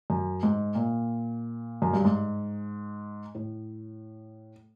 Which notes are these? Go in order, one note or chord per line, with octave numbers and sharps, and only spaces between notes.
F#2
G#2
A#2
F#2
G2
G#2
A2